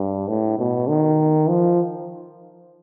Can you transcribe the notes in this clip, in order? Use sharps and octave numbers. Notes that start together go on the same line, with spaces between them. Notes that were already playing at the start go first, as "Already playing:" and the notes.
Already playing: G2
A2
B2
D#3
F3